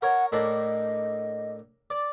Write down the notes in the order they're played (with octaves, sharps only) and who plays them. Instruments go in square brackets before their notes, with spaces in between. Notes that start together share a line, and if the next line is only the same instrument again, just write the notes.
[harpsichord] A#4 C#5 [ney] F#5
[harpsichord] A2 A#3 D4 [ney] D#5
[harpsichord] D5